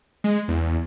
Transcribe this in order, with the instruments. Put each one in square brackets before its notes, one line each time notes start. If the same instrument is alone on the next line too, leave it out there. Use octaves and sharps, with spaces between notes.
[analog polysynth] G#3
E2